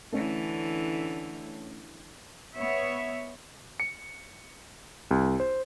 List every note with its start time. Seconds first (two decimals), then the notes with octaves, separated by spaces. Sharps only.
0.12 D3 E3 A3 C#4
2.55 B3 C#5 E5
3.80 C#7
5.11 C2
5.40 C5